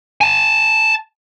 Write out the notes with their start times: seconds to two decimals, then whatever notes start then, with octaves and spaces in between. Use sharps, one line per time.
0.21 G#5 A5